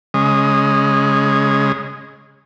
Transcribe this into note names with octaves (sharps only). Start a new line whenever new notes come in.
C#3 G#3